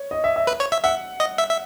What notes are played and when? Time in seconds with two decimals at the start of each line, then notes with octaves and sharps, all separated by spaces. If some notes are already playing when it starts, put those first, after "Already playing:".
Already playing: C#5
0.11 D#5
0.24 E5
0.36 E5
0.47 B4
0.60 C#5
0.72 E5
0.84 E5 F#5
1.20 D#5
1.38 E5
1.49 E5